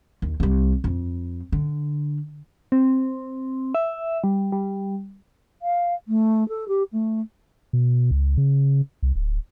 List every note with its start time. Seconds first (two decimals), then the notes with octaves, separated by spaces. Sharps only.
0.22 D#2
0.40 C2 G3
0.84 F2
1.52 D3
2.72 C4
3.75 E5
4.24 G3
4.52 G3
5.62 F5
6.08 A3
6.49 A4
6.68 G4
6.92 A3
7.73 B2
8.11 C#2
8.37 C#3
9.03 C2
9.15 D1